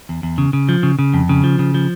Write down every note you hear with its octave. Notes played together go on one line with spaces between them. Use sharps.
E2
E2
C#3
C#3
F3
C#3
C#3
F2
C#3
F3
C#3
F3